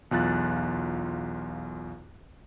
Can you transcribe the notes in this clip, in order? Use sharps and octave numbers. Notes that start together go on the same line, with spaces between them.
B1 E2 F4 F#6 A6